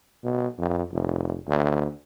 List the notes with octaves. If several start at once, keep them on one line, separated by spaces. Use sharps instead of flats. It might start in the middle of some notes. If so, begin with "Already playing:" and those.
B2
F2
F1
D2